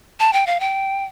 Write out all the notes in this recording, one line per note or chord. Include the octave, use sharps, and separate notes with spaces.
A5
G5
F5
G5